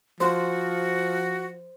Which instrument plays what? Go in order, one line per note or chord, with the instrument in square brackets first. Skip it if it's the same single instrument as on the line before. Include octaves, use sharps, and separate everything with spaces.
[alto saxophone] F3 [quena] F#4 [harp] C5